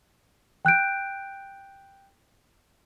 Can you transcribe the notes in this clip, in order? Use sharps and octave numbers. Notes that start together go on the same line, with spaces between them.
G5 F#6 G6 D7